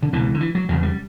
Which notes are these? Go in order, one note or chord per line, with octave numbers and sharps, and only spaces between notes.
D3
C#2 B2 E3
D3
E3
F#3
E2 C#3 F#3
G3